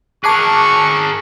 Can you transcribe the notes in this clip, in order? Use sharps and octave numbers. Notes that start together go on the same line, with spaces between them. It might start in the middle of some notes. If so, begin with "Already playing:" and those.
G#4 A#4 A5 C#6 D6 F#6